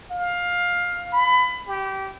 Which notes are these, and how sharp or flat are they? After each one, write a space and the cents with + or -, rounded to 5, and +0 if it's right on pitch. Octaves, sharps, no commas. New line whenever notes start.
F5 +15
B5 +25
G4 -20